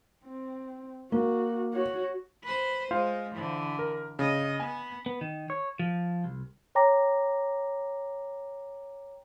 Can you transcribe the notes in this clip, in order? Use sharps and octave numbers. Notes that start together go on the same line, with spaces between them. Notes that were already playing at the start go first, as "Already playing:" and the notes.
C4
A#3 F#4
F#4 C#5
B4 C5
G#3 F4 C5 F5
D3 E3
A#4
C#3 D#5
B3 G#5
B3
D#3
C#5
F3
C2
C#5 G5 A#5 D6 A#6